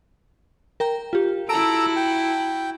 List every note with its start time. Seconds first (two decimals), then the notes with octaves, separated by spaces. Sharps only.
0.80 A#4 G5 A#5
1.13 F4 G4
1.49 E4 F#4 A4 A#5 E6 D7
1.96 G5